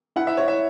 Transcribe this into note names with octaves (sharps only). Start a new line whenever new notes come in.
E4 F#5
E5
E4 C#5
E5